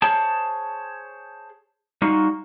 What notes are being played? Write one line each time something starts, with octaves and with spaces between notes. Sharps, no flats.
G#4 C5 C#5 A5
G3 D#4 F4 F#4